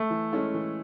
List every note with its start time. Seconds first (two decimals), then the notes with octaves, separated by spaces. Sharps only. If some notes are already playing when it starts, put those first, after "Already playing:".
Already playing: A3
0.10 E3
0.32 G#3 C#4 E4 A4
0.54 E3